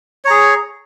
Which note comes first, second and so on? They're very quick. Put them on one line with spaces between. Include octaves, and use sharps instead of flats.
C#5 A#5 G#4